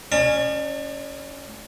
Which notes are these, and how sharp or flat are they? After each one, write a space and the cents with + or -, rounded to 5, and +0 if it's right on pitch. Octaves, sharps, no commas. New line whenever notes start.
C#4 +0 D5 +45 A5 +30